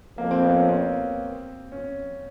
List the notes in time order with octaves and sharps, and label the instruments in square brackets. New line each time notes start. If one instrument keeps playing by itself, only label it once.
[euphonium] F2 [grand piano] A#3
[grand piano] C4
B3
C#4
C4
C#4